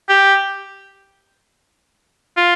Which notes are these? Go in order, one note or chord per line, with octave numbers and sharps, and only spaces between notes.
G4
F4